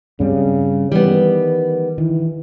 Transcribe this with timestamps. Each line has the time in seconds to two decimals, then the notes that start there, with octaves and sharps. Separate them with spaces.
0.20 G2 C#3 G3 C4
0.91 D#3 E3 G3 B3
1.98 D#3 E3